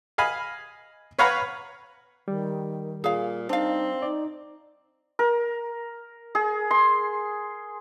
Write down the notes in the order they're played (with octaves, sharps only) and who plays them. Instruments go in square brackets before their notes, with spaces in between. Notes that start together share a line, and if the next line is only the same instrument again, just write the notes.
[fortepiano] D#5 F5 G#5 B5
B4 C#5 F5 F#5 A#5 B5
[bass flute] D#3 [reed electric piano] G3
[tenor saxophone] A#2 [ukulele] G#4 F5
[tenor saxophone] C4 [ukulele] D4 F5 [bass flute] D#4
[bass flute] D#4 [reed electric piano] D5
[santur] A#4
G#4
C6